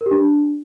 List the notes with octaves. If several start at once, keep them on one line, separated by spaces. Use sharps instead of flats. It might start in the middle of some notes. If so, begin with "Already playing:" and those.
A#4
G4
D4